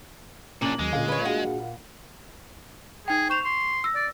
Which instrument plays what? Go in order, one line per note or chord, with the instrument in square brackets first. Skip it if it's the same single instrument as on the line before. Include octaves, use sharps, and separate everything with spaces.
[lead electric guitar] A#2 D4 [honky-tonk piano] C#3 F#7 [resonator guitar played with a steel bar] A#3
[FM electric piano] D#2 F#3 [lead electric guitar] G#3
[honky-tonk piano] A#2 F5 [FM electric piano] D3 C#4
[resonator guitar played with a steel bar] B4 C#5
[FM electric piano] D4 F#4 G#4 [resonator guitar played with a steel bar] F#5
[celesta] D#4 G5 [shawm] G#4
[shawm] C5 [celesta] C#6 E7 F7
[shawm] C6
[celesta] E6 A#6
[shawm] D5